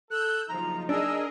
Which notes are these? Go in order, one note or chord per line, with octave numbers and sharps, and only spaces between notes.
A4 E6 F#6 G6
F#1 F3 D#4 A#5
D4 G#4 A#4 D#5 E6